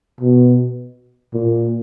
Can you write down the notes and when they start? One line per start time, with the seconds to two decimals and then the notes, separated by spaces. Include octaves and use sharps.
0.20 B2
1.33 A#2